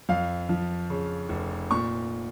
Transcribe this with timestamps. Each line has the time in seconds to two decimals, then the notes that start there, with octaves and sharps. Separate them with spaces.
0.09 F2 F5
0.49 F3
0.90 C#3
1.29 F1
1.71 A#2 C#6